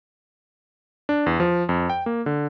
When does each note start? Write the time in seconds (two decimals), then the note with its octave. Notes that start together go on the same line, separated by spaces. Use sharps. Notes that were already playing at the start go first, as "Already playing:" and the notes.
1.09 D4
1.26 E2
1.40 F3
1.69 F2
1.90 G5
2.06 A#3
2.26 D3